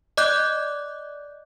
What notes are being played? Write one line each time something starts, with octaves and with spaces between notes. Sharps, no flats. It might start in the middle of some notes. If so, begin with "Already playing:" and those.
D5 D#5 D6 F#6 G6